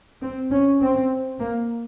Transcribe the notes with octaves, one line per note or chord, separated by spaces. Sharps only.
C4
C#4
C4
A#3